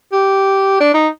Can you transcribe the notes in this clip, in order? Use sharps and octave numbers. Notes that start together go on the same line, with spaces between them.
G4
D4
D#4